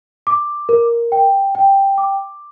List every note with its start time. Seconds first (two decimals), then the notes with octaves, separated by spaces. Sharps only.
0.27 D6
0.69 A#4
1.12 G5
1.55 G5
1.98 D6